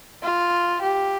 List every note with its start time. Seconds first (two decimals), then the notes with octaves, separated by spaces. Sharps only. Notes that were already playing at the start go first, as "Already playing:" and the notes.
0.23 F4
0.82 G4